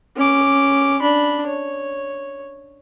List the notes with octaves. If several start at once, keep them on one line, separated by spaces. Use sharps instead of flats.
C#4 D6
D4 B5
C#5